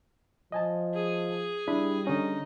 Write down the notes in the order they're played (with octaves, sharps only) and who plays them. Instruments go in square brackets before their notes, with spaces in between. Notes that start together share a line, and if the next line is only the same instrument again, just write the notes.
[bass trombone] F3 [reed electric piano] D#5 G#5 A5
[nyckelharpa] G#4
[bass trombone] G3 [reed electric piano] D4 E4 B5
[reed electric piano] D3 C#4 [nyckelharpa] D#4